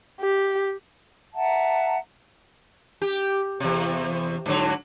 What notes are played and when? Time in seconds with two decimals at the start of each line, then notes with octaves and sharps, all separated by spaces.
0.21 G4
1.34 E5 F#5 A5 A#5
3.02 G4
3.60 E2 C3
4.46 G#2 D3 F#3